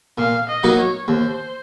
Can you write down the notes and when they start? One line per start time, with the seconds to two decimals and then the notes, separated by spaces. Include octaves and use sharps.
0.18 A#2 F5
0.49 D#5
0.63 F#3 A#3 D#4 F#4
0.79 C#5
1.08 D#2 C5